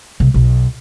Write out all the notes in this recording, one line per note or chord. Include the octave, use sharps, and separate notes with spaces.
C2
B1